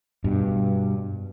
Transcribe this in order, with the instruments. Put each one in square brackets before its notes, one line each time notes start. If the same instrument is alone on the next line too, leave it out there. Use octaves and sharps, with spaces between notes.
[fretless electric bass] G2 B2